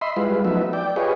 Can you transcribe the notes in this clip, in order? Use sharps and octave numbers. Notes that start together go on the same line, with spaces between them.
D#5 E5 B5 C6
G3 G#3 E4 F4 B4
F3 F#3 A3 B3 D#4 E5
D5 G5
F4 G4 G#4 B4 C#5 D#5